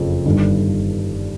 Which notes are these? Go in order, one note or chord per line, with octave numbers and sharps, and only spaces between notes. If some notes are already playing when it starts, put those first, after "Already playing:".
Already playing: F#1 F2 C#3 F3
G1 G2 D#3